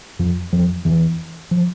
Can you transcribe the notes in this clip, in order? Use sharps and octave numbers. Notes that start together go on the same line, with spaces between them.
F2 F3
F2 F3
E2 E3
F3